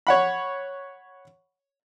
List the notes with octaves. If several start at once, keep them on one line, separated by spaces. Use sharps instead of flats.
C#5 F#5 B5